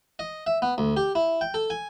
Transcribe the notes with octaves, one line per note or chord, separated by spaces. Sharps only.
D#5
E5
B3
D2
G4
E4
G5
A4
G#5